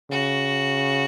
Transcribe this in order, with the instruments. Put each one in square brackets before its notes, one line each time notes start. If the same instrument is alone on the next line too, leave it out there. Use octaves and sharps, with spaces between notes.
[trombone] C#3 [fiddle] F#4